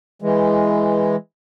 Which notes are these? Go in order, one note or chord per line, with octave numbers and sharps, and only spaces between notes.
E3 G#3